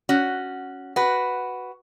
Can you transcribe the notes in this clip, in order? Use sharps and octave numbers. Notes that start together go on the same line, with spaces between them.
C#4 F#4
F#4 B4